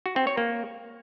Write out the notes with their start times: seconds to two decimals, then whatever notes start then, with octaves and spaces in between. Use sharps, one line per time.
0.06 F#4
0.16 C4
0.27 C#5
0.37 A#3